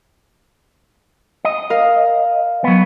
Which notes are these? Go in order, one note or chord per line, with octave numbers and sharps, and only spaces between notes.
D#5
A#4 F5
F#3 B3